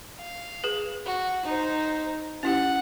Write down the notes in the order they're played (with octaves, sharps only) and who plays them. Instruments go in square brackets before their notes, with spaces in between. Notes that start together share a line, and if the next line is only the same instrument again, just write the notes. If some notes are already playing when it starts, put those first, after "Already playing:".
[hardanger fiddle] F5
[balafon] G#4 B4
[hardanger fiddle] F#4
D#4 C5
[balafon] C#4 E4 G4 [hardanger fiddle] F#5